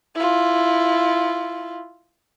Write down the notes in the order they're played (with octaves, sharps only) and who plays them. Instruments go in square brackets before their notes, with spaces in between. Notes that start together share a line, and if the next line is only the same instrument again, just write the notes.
[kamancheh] E4 F4